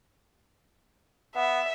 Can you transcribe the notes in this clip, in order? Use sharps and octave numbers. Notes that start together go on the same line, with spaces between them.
B3 E5